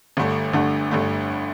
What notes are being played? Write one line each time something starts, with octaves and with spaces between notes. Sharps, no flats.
G1 G2 D3 A3
G1 G2 D3 A3
G1 G2 D3 A3